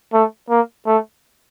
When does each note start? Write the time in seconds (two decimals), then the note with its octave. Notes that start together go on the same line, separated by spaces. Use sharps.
0.13 A3
0.50 A#3
0.87 A3